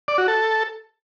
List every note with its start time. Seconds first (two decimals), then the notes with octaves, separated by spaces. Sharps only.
0.08 D5
0.18 F#4
0.28 A4